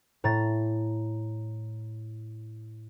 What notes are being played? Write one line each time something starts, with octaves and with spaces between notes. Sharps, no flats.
A2 A#5 A6